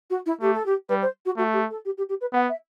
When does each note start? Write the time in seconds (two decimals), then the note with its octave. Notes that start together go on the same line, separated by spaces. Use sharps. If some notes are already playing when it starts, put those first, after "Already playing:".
0.10 F#4
0.26 E4
0.41 A3 G4
0.53 A4
0.66 G4
0.89 G3 B4
1.02 C5
1.25 F#4
1.37 A3 F#4
1.53 G4
1.70 A4
1.85 G4
1.97 G4
2.09 G4
2.21 B4
2.33 B3 F#5
2.49 E5